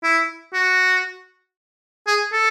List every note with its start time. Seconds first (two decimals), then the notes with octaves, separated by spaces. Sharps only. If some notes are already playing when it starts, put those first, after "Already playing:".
0.03 E4
0.54 F#4
2.07 G#4
2.33 A4